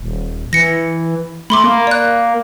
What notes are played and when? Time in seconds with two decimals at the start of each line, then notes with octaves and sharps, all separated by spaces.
0.01 D#1
0.53 E3 A#6 C#7
1.50 A3 B5 C6 D6
1.64 A#3
1.87 D5 F#6